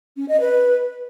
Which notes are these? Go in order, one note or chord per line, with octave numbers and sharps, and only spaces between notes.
C#4
D#5
B4